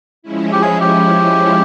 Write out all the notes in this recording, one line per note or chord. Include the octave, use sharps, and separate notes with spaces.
F3 G#3 C#4 E4
G4
G#4
G4